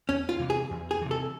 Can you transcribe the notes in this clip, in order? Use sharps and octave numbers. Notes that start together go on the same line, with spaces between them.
E2 C#4
F4
C3 E3
G#4
E2
G#4
C3 E3
A4